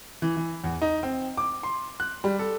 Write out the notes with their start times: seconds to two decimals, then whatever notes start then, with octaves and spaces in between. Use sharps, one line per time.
0.22 E3
0.37 E3
0.64 E2
0.82 D#4
1.03 C4
1.37 D6
1.63 C6
2.00 F#6
2.24 G3
2.39 A4